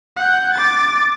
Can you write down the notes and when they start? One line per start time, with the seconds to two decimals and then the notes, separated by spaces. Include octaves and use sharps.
0.16 F#5 G6
0.53 D6 A6